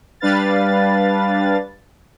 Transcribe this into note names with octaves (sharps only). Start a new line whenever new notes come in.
G3 D4 B4 F5 A6